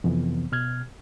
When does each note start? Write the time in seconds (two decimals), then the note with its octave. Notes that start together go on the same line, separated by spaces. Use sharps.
0.04 F2 C3 E3 B3
0.52 B2 F6 G#6